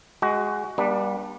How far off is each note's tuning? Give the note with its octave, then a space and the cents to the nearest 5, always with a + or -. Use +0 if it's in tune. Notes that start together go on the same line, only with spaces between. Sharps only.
G#3 +0 F#4 +20
G3 +10 A#3 +45 D4 +10